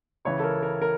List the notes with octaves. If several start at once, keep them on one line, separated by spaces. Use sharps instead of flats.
C#2 C#3 E3 C#5
A4
A#4
A#4
A#4